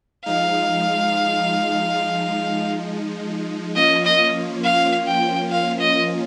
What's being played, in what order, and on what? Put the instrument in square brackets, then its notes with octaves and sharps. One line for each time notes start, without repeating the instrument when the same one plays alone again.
[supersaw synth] F3 G#3 D#4 [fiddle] F5
[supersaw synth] F3 A#3 C#4 F4 [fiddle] D#5
[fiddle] D#5
F5
G5
F5
D#5